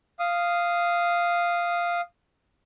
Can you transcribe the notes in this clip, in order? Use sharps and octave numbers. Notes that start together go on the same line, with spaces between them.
F5 D#6